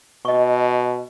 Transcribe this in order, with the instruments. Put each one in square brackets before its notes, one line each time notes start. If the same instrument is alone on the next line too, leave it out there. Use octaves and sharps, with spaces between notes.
[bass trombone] B2 [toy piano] D#5 C#6